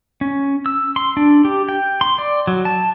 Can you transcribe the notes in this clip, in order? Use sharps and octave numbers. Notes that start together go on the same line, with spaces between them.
C#4
E6
C6
D4
G4
G5
C6
D5
F#3
A5